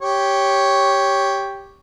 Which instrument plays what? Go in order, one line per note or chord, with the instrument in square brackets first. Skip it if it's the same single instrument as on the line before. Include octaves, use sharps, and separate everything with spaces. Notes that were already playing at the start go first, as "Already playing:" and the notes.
[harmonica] G4 C#5